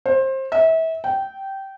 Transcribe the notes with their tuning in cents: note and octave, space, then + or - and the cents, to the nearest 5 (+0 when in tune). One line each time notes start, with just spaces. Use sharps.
C5 +25
E5 -30
G5 -15